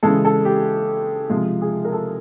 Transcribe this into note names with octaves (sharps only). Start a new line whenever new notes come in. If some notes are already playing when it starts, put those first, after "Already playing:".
C#3 E3 G#3 A4
A4
G4
C3 F3 G#3 F4
G#4
A#4
A4